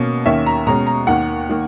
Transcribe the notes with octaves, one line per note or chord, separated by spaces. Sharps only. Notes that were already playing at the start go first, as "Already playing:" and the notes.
Already playing: B2 A#3 C#4
D#2 D#3 A#3 C#4 E5
A#5
B2 G#3 C#4 A#5
A#5
D#2 D#3 A#3 F#5
D#3 A#3